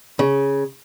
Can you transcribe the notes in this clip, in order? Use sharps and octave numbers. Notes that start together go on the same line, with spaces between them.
C#3